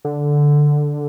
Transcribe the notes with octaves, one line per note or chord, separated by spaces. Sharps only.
D3